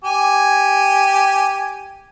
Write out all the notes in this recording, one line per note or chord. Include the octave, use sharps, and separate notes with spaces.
G4 G#5